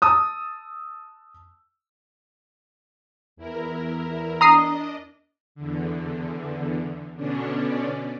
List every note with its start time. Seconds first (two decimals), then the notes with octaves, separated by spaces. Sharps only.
0.02 A5 D#6 E6
3.36 E2 E4 A#4
4.41 D4 D#5 A#5 D#6 C7
5.55 E2 D3
7.15 B2 D3 C#4 D4